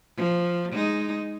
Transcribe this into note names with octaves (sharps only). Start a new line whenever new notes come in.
F3
G#3 D#4